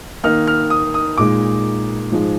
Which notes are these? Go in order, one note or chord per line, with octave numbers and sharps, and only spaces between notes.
D#3 A#3 D#4 F6
F6
D#6
D#6
A#2 G#3 D#4 D6
G#2 F3 G#3